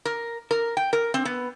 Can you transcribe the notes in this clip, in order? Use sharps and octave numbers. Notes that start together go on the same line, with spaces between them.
A#4
A#4
G5
A#4
C4
B3